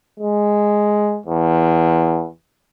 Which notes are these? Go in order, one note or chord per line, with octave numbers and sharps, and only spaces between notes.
G#3
E2